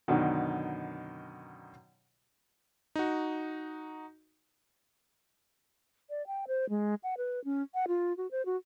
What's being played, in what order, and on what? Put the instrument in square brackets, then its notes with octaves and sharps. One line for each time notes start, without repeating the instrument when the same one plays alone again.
[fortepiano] F#2 B2 D3 D#3
[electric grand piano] D#4 F#4
[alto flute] D5
G5
C5
G#3
F#5
B4
C#4
F#5
F4
F#4
C5
F#4